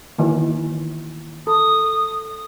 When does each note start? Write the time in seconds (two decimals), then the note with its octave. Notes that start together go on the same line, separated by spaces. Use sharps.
0.18 D#3 E3 A#3
1.47 A4 D#6